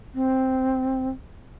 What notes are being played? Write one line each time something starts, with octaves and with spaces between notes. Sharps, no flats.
C4